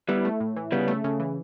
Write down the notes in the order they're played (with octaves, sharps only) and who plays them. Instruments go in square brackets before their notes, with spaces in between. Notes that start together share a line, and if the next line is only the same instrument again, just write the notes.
[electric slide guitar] G3 B3 [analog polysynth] E4
[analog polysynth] A3
A2
E3
[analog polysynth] C#3 [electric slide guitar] G3 B3
[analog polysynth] A3
C#3
E3